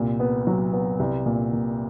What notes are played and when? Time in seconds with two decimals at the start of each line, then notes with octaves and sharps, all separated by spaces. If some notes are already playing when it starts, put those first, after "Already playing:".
Already playing: C2 A#2
0.20 B3
0.47 F#3
0.73 B3
0.99 C2
1.26 A#2
1.53 A#2